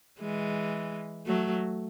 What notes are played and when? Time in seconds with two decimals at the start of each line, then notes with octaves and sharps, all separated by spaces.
0.20 E3 G#3
1.26 F#3 A3